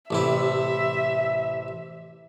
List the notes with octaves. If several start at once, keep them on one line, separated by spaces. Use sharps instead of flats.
A1 C3 E4 E5